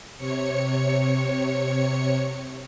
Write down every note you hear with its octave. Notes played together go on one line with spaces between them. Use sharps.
C3 C#5 C#7